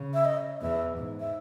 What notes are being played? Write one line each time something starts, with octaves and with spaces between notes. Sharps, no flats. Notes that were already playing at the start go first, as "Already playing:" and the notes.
Already playing: C#3
E5
D#5
E2 E5
G#2
E5